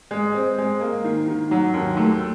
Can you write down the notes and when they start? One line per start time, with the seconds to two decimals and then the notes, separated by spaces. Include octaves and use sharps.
0.11 G#3
0.35 C4
0.58 G#3
0.81 A#3
1.04 D#3
1.28 D#3
1.51 F#3
1.74 D#2
1.97 A3